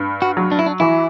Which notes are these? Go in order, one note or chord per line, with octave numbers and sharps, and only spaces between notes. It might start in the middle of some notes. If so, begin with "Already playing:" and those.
Already playing: G2
F#4
F#3
D4
E4
D4
E3 E4